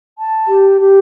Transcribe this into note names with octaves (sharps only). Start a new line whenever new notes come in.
A5
G4
G4